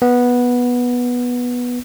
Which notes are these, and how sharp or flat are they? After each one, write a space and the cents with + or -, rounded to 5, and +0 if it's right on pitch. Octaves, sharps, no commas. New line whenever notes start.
B3 -10